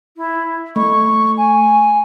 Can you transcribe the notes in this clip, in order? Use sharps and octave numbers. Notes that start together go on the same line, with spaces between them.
E4
A3 C#6
G#5